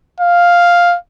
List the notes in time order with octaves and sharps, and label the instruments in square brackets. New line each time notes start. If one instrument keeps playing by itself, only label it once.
[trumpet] F5